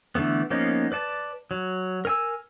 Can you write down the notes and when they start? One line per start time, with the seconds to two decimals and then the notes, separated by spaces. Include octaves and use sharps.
0.15 D3 E3 A3 B3
0.50 F3 A#3 B3 C#4 D#4
0.92 B4 D5 A5
1.51 F#3
2.05 A#4 G#5 E6